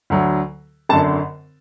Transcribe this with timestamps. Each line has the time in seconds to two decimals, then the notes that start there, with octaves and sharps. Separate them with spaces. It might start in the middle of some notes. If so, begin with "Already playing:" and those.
0.10 D2 D3 F#3
0.89 G#1 F#2 D3 A5